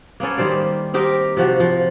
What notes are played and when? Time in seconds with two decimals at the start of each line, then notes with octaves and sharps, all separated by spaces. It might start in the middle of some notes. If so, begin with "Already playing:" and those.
0.20 A#3 B3 C#4 A4
0.38 D#3 G3 C5 D5
0.94 C4 D#4 G4 A#4
1.37 C3 F3 F#4
1.60 F3